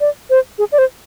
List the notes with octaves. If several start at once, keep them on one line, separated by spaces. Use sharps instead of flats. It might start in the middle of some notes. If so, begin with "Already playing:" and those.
D5
C5
G#4
D5
C5